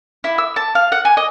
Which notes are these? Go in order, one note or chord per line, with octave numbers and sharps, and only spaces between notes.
E4
E6
A5
F5
F#5
G#5
D#5